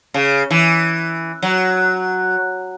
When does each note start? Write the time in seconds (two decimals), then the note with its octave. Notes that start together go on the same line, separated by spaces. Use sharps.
0.14 C#3
0.51 E3
1.43 F#3